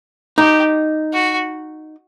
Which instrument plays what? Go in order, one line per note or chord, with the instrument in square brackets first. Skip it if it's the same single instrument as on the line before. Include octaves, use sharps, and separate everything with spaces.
[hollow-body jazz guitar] D#4 [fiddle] G4
[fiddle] F#4